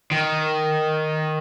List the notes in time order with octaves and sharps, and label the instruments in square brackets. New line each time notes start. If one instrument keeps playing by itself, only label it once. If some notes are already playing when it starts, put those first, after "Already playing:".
[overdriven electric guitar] D#3